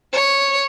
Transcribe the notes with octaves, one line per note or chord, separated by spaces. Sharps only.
C#5